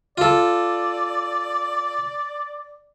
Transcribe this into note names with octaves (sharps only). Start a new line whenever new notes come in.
F4 A4 D5